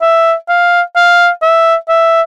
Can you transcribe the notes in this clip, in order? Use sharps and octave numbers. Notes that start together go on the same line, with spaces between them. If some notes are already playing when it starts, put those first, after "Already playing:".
E5
F5
F5
E5
E5